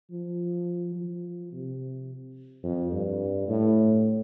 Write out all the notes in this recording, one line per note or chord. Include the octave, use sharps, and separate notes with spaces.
F3
F3
C3
F2
G2
A2